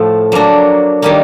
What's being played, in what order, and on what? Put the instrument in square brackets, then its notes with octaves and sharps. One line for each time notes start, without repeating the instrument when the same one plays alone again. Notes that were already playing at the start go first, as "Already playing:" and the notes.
Already playing: [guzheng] A2 F3 A3
F#3 A#3 D4 F#4
D#3 G3 A#3